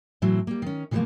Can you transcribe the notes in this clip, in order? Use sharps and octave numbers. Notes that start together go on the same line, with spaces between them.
A2 E3 F#3 C4 E4
G3 A#3
D#3 C#4
C3 E3 F3 G3 A3 A#3